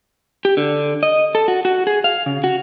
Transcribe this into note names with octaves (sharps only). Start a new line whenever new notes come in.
G4
D3
D#5
A4
F#4
F#4
G#4
F5
C#3
F#4